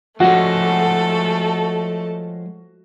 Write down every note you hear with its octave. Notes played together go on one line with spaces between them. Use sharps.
F3 G#3 A3 C#4 F#4 A4